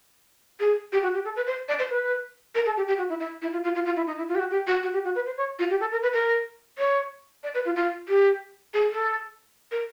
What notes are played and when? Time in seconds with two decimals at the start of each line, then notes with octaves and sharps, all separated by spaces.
0.60 G#4
0.92 G4
1.03 F#4
1.14 G4
1.24 A4
1.36 B4
1.46 C5
1.68 D5
1.79 C5
1.90 B4
2.55 A#4
2.66 A4
2.77 G4
2.87 G4
2.98 F#4
3.09 E4
3.20 E4
3.42 E4
3.52 F4
3.63 F4
3.75 F4
3.85 F4
3.96 E4
4.07 D#4
4.18 E4
4.29 F4
4.35 G4
4.39 F#4
4.50 G4
4.67 F#4
4.83 F#4
4.93 G4
5.04 F#4
5.15 B4
5.26 C5
5.37 C#5
5.59 F4
5.70 G4
5.80 A4
5.92 A#4
6.02 B4
6.13 A#4
6.78 C#5
7.43 D5
7.54 B4
7.65 F4
7.76 F4
8.08 G4
8.74 G#4
8.90 A4
9.71 A#4